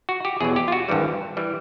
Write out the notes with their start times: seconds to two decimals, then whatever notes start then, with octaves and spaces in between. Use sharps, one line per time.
0.09 F#4
0.25 G4
0.40 E2 B2 F#3 G#4
0.56 G4
0.68 F4
0.72 F#4
0.89 G#1 G2 E3 G3
1.37 E3 G3